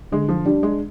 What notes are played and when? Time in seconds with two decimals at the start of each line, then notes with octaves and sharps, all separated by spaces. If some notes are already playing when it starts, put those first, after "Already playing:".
0.12 D3 G#3
0.29 F3
0.45 G3 D4
0.63 G#3